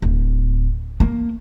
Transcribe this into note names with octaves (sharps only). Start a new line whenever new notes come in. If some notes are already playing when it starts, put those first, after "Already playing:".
D1
A#3